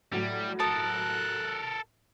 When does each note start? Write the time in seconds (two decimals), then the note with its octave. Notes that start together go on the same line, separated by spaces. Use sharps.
0.12 A2 F#3 G3
0.59 A4 A#4 A5 D#6 F#6